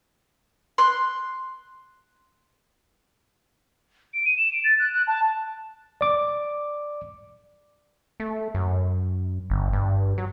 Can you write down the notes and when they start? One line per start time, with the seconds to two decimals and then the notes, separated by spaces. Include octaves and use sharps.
0.78 C6 F#6
4.14 D7
4.25 D#7
4.37 E7
4.53 D7
4.64 A6
4.79 F#6
4.94 F#6
5.07 A5
6.01 D5 D6
8.20 A3
8.54 F#2
9.50 G1
9.73 G2
10.18 F#3